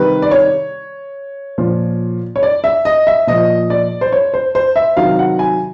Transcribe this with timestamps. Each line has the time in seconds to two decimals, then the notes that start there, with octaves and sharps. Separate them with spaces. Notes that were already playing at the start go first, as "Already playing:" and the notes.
Already playing: C3 D#3 G3 B4
0.22 D5
0.31 C#5
1.58 A#2 F3
2.36 C#5
2.43 D5
2.64 E5
2.85 D#5
3.07 E5
3.27 A#2 F3 D#5
3.70 D5
4.01 C5
4.12 C#5
4.34 C5
4.55 C5
4.76 E5
4.97 C3 D#3 F#3 F5
5.19 F#5
5.39 G#5